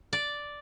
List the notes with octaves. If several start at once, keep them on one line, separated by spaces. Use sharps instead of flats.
D5